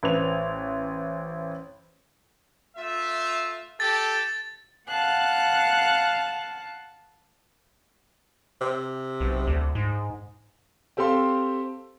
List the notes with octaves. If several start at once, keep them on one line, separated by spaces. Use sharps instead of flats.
A1 B4 C5 F7
A3 F4 E5
G4 A4 A6
F5 F#5 A5 F#6
C3
B1
D2
G#2
C4 G4 A4 F5 C6